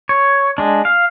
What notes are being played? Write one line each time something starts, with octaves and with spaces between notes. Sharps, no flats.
C#5
G#3 D4
F5